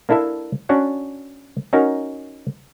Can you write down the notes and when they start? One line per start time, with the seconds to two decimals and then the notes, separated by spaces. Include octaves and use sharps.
0.09 A#3 D4 E4 A4 E5
0.69 C#4 D4 F#4 F#5
1.73 C#4 D#4 F#4 A#4